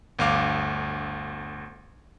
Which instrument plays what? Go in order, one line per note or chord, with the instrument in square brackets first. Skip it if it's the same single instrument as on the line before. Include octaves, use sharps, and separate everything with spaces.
[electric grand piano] G1 D2 F5 D6